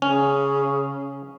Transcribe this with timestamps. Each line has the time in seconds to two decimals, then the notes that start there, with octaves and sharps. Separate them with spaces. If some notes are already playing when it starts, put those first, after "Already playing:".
0.02 C#3 C#4